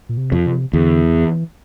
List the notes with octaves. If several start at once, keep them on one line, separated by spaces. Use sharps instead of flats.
A#2
C3
F2
C3
E2 D3
E3